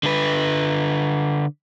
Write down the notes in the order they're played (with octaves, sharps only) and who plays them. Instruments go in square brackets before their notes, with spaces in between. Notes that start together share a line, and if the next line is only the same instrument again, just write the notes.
[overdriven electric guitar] D3 B4